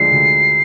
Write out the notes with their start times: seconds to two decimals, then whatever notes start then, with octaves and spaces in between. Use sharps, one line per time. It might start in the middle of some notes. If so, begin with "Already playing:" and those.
Already playing: D2 D3 F3 G#3 D4 C7
0.11 D2